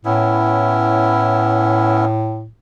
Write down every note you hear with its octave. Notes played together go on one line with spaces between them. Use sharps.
A2 B3 C#4 E4